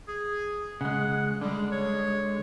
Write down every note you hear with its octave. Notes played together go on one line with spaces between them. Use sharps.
G#4
C#3 G#3 F#5
D3 G3 G#3
C#5